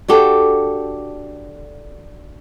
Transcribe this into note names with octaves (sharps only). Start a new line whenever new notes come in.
D4 F#4 G4 A4